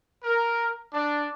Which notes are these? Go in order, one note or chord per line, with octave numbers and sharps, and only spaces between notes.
A#4
D4